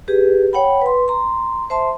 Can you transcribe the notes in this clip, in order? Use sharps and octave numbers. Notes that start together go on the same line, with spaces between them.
G4 G#4 B4
C#5 F#5 G5 B5
B4 C6
A#5 C6
C5 E5 A5 C6